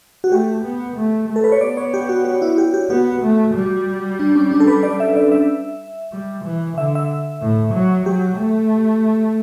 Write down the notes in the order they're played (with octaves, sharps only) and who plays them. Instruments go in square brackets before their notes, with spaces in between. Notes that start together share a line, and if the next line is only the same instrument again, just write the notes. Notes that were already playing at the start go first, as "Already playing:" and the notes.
[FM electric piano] F#4
[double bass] A3 [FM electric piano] G4
[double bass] B3
A3
A3
[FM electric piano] A4
B4
C#5
[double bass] B3 [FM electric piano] D5
[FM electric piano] C#5
G4
F#4
F#4
E4
G4
G4
[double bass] B3 [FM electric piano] F#4
[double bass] A3
G3
[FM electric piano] D4
C#4
D4
A4
B4
D5
E5
D5
E5
[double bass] G3
E3
[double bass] D3 [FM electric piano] E5
[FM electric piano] E5
[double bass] A2
F#3
[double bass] F#3 [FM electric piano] G4
[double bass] A3